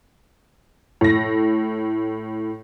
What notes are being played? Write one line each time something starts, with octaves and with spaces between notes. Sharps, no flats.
A2 A#6